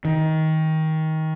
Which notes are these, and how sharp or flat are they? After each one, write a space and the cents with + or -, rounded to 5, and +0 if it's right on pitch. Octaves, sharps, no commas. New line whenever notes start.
D#3 +20